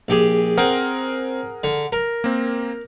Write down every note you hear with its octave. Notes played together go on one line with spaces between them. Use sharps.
A#1 G4 G#4
C4 G#4 A#4 C5 F#5
D3
A#4
A#3 C4